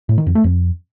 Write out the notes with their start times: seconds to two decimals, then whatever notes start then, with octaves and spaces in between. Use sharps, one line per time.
0.09 A2
0.18 D#3
0.27 F2
0.35 A3
0.44 F2